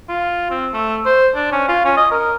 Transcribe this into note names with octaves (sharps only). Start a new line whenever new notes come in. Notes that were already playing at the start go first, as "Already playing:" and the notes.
F4
C4
A3
C5
D4
C#4
F4
C#4
D#5
A#4